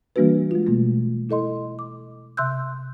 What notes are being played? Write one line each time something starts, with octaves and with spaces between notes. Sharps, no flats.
E3 G3 A#3 D4 F#4 B4
G#3 F4
B2 G3 A3 A#3
E4 A4 D#5 C6
D6
C3 E5 C6 E6 F#6 G6